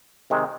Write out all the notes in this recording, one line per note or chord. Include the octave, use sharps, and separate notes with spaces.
C3 D#3 G#3